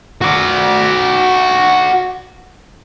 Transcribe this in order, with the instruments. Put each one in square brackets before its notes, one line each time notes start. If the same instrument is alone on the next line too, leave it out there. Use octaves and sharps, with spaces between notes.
[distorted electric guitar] F#4 D5